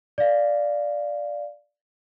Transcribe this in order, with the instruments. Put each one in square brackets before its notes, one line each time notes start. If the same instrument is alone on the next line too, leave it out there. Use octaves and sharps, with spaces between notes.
[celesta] D5 F5